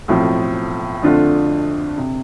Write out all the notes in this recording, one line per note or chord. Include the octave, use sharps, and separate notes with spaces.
B1 A2 F3 C4
F2 D3 A3 D4 F4
C3